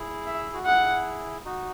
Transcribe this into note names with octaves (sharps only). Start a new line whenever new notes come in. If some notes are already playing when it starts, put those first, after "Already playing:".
Already playing: E4 G#4
E5
F#4
E4 G#4 F#5
D#4 F#4